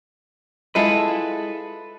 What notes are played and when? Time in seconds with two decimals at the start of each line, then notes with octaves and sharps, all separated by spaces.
0.75 G#3 E4 F4 A4 B4